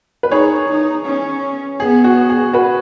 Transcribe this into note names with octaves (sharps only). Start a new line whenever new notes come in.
B4
D#4 G#4 C#5
D#4
C#4
B3 G#4
F#4
G#4
F#4 B4